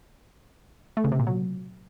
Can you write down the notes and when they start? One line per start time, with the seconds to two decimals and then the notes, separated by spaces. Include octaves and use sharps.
0.97 A3
1.04 C#3
1.12 C3
1.19 A#2
1.27 F#3